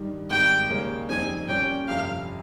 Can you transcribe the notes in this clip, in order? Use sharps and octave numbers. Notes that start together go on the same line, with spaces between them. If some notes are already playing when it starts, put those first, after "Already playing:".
Already playing: G2 D#3 G3
G#1 G#2 D#3 G3 G5
D#2 C#3 G3 A#3 C#4
F2 D#3 G3 C4 D#4 G#5
A#2 G3 C#4 G5
G1 F2 C3 F5